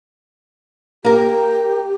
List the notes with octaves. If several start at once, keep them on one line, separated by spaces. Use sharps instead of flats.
A#3 G4 A#4